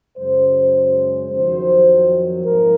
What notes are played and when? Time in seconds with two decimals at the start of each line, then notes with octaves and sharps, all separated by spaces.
0.16 F#2 C#3 G#3 C5
0.73 C5
1.31 F2 D#3 F#3 C5
2.45 G#2 F3 A#3 D#4 A#4